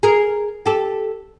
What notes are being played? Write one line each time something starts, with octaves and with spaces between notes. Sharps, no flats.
G#4 A#4
G4 A4